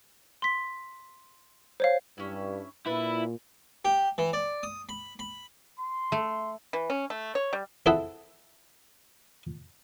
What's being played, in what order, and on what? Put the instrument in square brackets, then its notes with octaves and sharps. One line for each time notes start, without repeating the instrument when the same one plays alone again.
[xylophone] C6 B6
C5 C#5 F5
[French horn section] G2 [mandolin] C#4 E4
[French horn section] A#2 [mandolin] D4 B4 E5 [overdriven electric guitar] E4
[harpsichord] G4
E3
D5
D#6
B5
B5
[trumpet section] C6
[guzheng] A3
[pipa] E3
C#4
A3
C#5
G3
[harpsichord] C4 E4 G#4 A4 E5 F#5